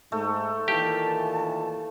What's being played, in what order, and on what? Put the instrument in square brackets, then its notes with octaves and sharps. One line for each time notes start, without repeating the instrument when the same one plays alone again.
[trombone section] G#2 [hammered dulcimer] A3
[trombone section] A#2 D#3 E3 [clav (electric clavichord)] G4 [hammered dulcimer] F5 [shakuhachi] A5